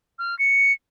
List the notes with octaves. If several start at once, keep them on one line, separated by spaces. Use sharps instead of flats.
F6
C#7